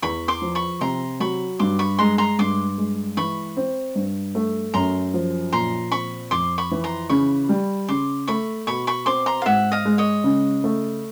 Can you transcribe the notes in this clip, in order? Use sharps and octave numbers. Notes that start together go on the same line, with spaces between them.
E2 B5 C#6
C6 D6
F3
B5 C#6
C3 A#5 C6
F#3 B5 C#6
G2 C6 D6
B5 C#6
G#3 A#5 C6
A#5 C6
G2 C6 D6
G#3
E3 B5 C#6
C4
G2
A3
F#2 A#5 C6
F3
A#2 A#5 C6
C4 B5 C#6
F2 C6 D6
B5 C#6
E3
A#5 C6
C#3 B5 C#6
G3
C#3 C6 D6
A3 B5 C#6
B2 B5 C#6
B5 C#6
C4 C6 D6
A#5 C6
F5
G#2 E5 F#5
D#5 F5
G#3
C#5 D#5
C#3
A3